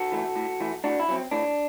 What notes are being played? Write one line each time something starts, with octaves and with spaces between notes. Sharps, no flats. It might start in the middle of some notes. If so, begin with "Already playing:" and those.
Already playing: F#4 A4
E3 A3
A2
E3 A3
A2 D4 F#4
E4
F#3 C4
A2 D4